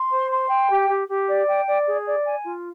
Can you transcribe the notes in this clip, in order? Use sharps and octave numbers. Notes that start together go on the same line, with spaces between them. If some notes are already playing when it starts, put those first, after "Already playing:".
Already playing: C6
C5
C6
G5
G4
G4
G4
D5
G5
D5
G#4
D5
G#5
F4